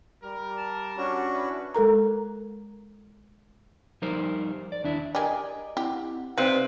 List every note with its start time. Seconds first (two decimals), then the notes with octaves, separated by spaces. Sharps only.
0.23 G3 A#4
0.57 A5
0.97 C#4 D4 F#4
1.33 E4 B4
1.74 G#3 A4 A#4 A#5
4.02 F3 G3 D#4 A#4 C5
4.72 D5
4.84 D#2 D4 E4
5.15 G4 G#4 A#4 D5 D#5 D6
5.77 C4 E4 G4 F#5
6.37 C3 C4 D#4 B4 C5 D5 F5